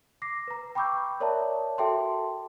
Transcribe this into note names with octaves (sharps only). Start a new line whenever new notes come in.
D6 A#6 C7
B4 A#5
G5 B5 C#6 D6 E6 G6
A#4 C#5 D5 E5 A5 A#5
F#4 A4 E5 G5 A5 C6